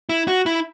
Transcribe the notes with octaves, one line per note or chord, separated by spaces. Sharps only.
E4
F#4
E4